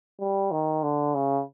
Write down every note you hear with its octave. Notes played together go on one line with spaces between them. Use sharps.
G3
D#3
D3
C#3